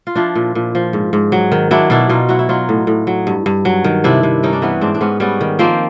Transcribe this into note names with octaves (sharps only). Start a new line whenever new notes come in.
F4
F3 D4 E4
A#2
A#2
F3
G#2
G#2
F#3
D#3
F#3 D4 E4
B2 D4 E4
B2 D#4 F4
F#3 E4 F#4
E4
F#3 D#4 F4
A2
A2
F#3
G2
G2
F#3
D#3
C3 D4 E4
C3
G3 C#4 D#4
D4
E3 B3 C#4
G#2 C4 D4
D4
G#2 B3 C#4
G3 B3 C#4
D#3
F3 A#3 C4